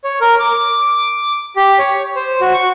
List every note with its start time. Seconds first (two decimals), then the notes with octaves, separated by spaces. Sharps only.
0.04 C#5
0.21 A#4
0.40 D6
1.56 G4
1.78 C#5
2.16 C5
2.41 F#4
2.54 C#6